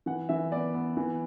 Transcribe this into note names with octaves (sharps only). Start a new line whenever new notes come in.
E3 F#5
E3 E5
B3 D5
B3
E3